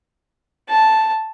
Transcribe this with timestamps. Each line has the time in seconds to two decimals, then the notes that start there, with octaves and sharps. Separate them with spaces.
0.69 A5